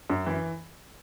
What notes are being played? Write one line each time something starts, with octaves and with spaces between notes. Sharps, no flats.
F#2
E3